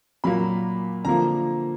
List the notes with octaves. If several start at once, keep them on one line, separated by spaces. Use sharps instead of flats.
A#2 F#3 A#3 B5
D3 F3 A#3 A#5